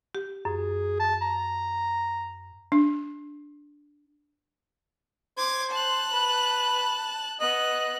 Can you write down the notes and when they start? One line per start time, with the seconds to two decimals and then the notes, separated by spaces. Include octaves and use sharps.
0.15 G4
0.45 F#2 G#4
1.00 A5
1.22 A#5
2.72 D4
5.37 C5 D6 G#6
5.71 A5 F#6
6.13 B4
7.41 B3 D#5 F#6